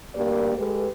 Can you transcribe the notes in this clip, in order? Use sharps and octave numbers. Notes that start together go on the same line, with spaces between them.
D2 G2 G3 A#3 A#4 D5
G#3 G4 A4 B4